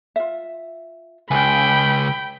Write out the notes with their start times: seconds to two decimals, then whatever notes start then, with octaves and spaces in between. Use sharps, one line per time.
0.16 F4 E5
1.31 C#2 G5 G#5 B5